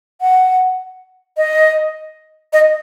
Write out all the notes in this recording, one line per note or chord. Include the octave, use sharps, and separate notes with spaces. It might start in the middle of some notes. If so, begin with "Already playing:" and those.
F#5
D#5
D#5